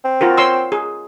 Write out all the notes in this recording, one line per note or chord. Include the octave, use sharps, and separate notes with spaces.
C4
F4 F#4 A#4
C#5 C6 E6
G#4